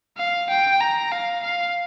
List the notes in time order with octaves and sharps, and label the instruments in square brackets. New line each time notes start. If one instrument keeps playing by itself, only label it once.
[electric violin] F5
G5
A#5
F5
F5